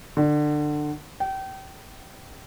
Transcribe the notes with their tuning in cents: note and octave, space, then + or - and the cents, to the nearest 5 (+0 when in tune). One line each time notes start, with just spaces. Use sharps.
D3 +25
G5 -30